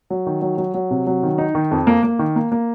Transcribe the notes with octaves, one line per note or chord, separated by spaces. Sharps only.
F#3
D#3
F#3
F#3
F#3
C3
F#3
D#3
D#4
D#3
F2
A#3
A#3
D#3
A#3
A#3